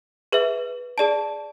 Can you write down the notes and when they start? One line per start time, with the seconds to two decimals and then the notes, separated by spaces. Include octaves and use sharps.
0.32 G#4 B4 E5
0.98 G#4 D5 A5